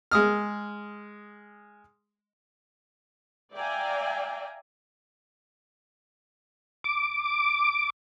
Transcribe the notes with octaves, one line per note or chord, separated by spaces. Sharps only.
G#3 D#6 F6
D5 E5 F5 G5 G#5 A#5
D6